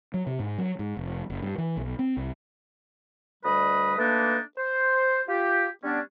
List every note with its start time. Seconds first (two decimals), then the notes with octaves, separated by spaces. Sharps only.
0.14 F#3
0.27 C3
0.39 G#2
0.58 F#3
0.79 G#2
0.97 F1
1.30 F#1
1.42 G2
1.58 E3
1.77 B1
1.99 C4
2.17 C2
3.44 D2 G3 B4 D#5 B5
3.98 A3 A#3 D4 D#4 B4
4.58 C5
5.28 F4 G4
5.84 G3 B3 C#4 D4